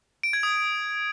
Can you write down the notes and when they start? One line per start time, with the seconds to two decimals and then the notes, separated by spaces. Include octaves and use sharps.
0.23 D7
0.33 G#6
0.43 D#6